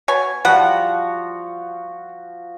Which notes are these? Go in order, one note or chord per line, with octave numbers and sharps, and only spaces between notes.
B2 C#5 G#5
F3 G3 F#4 F#5